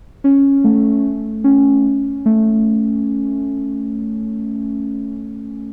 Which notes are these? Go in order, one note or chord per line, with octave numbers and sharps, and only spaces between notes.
C#4
A3
C#4
A3